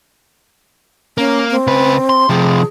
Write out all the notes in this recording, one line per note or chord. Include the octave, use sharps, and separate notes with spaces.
A#3 C#4
C4
C#3 B4
C6
C3 F3 G#4